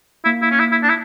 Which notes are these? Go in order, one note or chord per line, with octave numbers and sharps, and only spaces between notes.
A#3 E4
E4
C#4
E4
E4
D4
E4